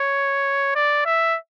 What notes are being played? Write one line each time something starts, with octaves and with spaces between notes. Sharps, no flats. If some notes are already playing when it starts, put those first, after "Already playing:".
Already playing: C#5
D5
E5